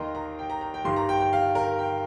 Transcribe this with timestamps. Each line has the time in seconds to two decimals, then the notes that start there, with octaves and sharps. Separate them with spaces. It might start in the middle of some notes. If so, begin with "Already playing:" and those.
Already playing: D#2 D#3 A#4 D#5 G5 A#5 C6
0.15 A#5
0.39 G5
0.50 A#5
0.61 A#5
0.74 G5
0.85 G2 D#3 G3 C6
0.96 A#5
1.09 G5
1.20 G5
1.33 F5
1.55 A#4
1.79 G5